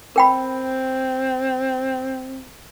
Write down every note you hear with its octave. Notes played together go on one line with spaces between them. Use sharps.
C4 A#4 G5 B5